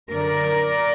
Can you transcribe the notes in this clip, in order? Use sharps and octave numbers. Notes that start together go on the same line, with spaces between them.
F#2 D3 A#4 D5